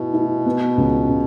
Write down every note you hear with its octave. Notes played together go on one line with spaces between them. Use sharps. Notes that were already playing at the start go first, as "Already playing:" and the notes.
Already playing: B2 B3 E4
E4
B3
C#2
C#3